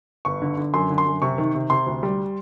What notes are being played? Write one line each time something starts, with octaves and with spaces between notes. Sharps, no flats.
G1 C#6
D3
D3
F#2 C6
D3
C6
F#2
C3 C#6
D#3
C3
C3 C6
D2
G3